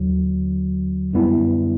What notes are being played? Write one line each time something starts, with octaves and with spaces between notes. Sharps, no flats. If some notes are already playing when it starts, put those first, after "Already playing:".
Already playing: D#2 D3 F#3
F#2 D3 G3 B3 E4